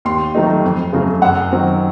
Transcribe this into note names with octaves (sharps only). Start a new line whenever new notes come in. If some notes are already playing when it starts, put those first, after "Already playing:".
D#2 C6
D#3 F#3 A3 D#4
F2
C#3 F#3 A3
F#2 F#5
D#3 F#3 C4